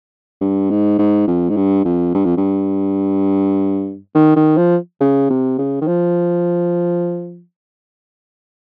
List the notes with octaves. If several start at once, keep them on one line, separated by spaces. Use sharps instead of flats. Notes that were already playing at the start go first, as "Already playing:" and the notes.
G2
G#2
G#2
F2
G#2
G2
F2
G2
F2
G2
D#3
D#3
F3
C#3
C3
C#3
D#3
F3